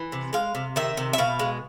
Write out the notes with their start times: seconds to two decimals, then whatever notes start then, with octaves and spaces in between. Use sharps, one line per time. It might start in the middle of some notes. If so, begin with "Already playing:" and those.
Already playing: E3
0.12 C3
0.33 G#3 F5
0.55 C3
0.76 D#3 E5
0.97 C3
1.13 E5
1.18 B2 F5
1.39 G#3